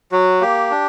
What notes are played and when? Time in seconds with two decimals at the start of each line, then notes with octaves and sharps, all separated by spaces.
0.12 F#3 F#4
0.41 A#3 G4
0.71 D4